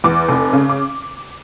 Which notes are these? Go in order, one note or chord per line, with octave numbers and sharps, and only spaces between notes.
E2 D6
F1
C#3
D6